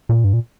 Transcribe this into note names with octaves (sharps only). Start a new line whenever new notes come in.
A#2
G2
A#2